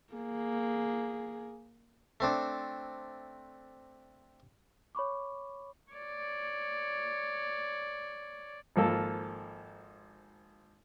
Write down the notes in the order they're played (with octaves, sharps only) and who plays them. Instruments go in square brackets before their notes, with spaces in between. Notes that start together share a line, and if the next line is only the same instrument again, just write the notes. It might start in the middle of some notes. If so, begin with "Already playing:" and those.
[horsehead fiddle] A#3 G#4
[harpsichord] A3 C4 D4
[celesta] C#5 B5 C#6 D6
[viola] C#5 D5
[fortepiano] G#1 F3 A#3 A4